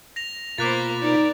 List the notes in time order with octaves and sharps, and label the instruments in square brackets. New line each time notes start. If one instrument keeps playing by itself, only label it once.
[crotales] A#6 F7
[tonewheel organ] B2 F4 B5 [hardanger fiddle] A#3 C5 [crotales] D6 F#6 A6
[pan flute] D#4 [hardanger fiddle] A#4 D5